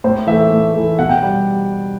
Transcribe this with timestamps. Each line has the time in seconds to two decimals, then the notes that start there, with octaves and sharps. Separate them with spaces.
0.04 A2 C5
0.27 E3 E5
0.31 A3
0.51 A2
0.74 E3 A3
0.99 B2 F#5
1.09 G5
1.22 G3